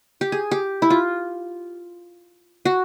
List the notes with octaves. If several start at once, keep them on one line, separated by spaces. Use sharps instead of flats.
G4
G#4
G4
E4
F4
F#4